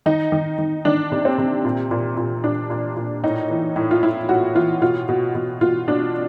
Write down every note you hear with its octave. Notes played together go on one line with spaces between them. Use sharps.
D#3 D#4
D#3
D#3
D#3 D4
C3
C4
C3
A#2
A#2
A#2
A#2 D4
A#2
A#2
A2 D#4
E3
A2
F4
A2 E4
A2 F#4
E3 F4
B2 F4
B2
B2
B2 F4
B2 D4